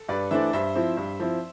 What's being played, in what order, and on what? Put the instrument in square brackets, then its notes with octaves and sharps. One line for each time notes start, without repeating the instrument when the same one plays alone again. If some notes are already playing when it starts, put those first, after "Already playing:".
Already playing: [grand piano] A4
[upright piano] G2 [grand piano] B4 D5
[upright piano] E3 A3 D4 [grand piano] C5 E5
[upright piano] G2 [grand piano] C5 E5
[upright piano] F3 C4 E4
G2
F3 C4 E4